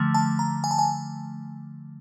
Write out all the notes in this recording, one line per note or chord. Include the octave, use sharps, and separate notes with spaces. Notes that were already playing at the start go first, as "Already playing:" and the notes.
Already playing: D3 F3 A3
A5
A#5
G#5
A5
G#5